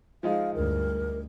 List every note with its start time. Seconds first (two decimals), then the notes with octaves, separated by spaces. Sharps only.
0.23 F3 G#3 D#4 F5
0.54 D2 G2 A#4